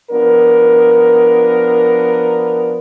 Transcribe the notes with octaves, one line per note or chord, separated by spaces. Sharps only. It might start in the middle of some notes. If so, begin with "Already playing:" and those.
F3 B3 D4 A#4